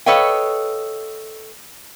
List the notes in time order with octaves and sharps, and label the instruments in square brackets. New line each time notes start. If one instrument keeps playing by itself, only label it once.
[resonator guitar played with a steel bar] A4 B4 C#5 D#5 F5 G5